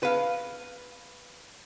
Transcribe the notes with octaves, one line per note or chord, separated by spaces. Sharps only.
B4 F5